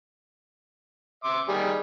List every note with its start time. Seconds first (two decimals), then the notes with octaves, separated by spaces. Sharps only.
1.24 E5 C6 D6
1.48 D#3 G3 G#4